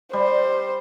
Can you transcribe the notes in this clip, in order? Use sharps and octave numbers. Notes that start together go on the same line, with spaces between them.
G3 C5